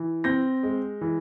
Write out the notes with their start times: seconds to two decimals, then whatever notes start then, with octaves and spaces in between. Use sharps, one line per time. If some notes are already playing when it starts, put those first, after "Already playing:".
Already playing: E3
0.24 C4 G6 A#6
0.63 G#3
1.01 E3